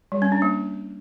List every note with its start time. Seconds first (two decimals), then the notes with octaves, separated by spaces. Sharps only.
0.12 G3
0.22 C#4
0.32 D4
0.42 A#3